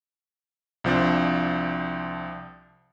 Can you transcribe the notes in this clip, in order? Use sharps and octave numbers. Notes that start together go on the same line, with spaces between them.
C2 F3 C4 D4